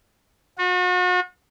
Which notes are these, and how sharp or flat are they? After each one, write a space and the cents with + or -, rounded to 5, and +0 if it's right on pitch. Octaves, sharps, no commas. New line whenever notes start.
F#4 -40